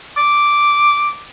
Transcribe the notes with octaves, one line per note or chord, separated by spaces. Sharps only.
D6